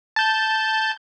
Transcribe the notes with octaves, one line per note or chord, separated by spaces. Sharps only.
A5 G6